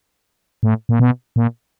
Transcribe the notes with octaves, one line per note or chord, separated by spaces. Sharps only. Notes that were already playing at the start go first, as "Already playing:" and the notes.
A2
A#2
B2
A#2